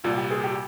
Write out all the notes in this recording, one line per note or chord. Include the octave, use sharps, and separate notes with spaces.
C2 A#2 G3 F4
G4
G#4
G4